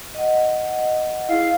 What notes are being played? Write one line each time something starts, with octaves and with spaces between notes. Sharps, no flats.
D#5 F#5
E4 G#4 F5